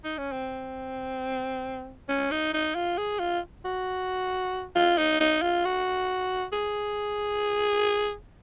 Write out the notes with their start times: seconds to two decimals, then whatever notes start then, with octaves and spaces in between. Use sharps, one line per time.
0.04 D#4
0.18 C#4
0.32 C4
2.09 C#4
2.31 D#4
2.54 D#4
2.75 F4
2.98 G#4
3.20 F4
3.65 F#4
4.76 F4
4.98 D#4
5.20 D#4
5.42 F4
5.65 F#4
6.53 G#4